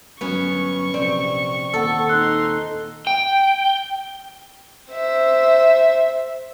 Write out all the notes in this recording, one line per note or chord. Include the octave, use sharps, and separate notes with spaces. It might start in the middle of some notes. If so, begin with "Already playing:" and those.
G1 F#3 B3 C#4 C#6
A#1 C3 C4 D5
D#2 A#2 A4 F#5 E6
D#4 C6 E6 F#6
G5
C5 E5